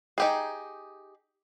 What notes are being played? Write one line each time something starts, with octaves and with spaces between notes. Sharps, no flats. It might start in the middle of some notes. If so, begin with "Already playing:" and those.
D#4 G4 G#4